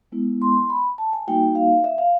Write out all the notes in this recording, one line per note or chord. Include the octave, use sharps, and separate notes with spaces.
G#3 B3 E4
C6
B5
A5
G#5
G3 A#3 D#4 F#4 G5
F5
E5
F5